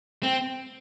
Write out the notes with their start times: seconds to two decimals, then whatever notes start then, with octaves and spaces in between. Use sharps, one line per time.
0.23 C4